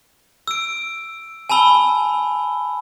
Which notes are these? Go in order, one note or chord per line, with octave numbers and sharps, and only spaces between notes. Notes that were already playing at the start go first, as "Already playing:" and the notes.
E6 D7
G#5 A5 B5 E6 G7